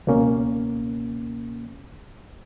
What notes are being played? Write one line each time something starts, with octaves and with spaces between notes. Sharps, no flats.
C#2 B2 A#3 C#4